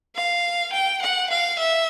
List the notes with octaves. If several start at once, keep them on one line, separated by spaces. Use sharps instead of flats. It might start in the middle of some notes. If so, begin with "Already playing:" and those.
F5
G5
F#5
F5
E5